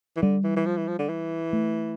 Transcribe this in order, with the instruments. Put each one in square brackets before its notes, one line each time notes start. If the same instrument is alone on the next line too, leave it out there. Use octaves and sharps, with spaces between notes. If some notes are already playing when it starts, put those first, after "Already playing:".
[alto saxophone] E3
[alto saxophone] D3 [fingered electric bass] G3
[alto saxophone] E3
E3
F3
E3
F3
D3
E3
[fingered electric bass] A3